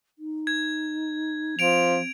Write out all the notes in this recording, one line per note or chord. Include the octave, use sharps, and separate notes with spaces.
D#4
G#6
F3 C4 D7 F7